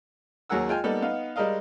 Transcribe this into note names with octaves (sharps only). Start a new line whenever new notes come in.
D#2 F#3 G#4 A#4 F#5 E6
G#3 F4 G5 G#5
G3 A#3 B3 D#4 A4
B3 D#4 F5
G3 G#3 A#4 D#5 F5